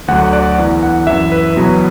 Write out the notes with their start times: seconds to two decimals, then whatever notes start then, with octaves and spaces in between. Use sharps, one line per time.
0.08 D2 D3 F#3 F#5
0.33 D5
0.58 E2 E3
0.83 F#5
1.07 F#2 E3 E5
1.32 B4
1.56 E2 B2 F#3